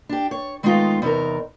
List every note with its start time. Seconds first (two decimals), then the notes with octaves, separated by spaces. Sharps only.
0.09 D4 G4
0.31 C#5
0.63 D#3 G#3 A3 B3 D#4 F4
1.02 E2 C3 D#4 A#4